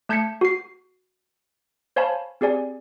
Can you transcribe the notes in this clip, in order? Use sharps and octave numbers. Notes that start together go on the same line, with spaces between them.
A3 A5 G6 G#6 B6 C#7
F#4 C7
C5 C#5 F5 G#5 A5 B5
C4 G4 G#4 D5 G#5